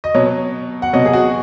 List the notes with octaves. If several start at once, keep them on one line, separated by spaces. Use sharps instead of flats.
D#5
B2 F#3 C#5
F#5
B2 F#3 D#5
G#4
F#4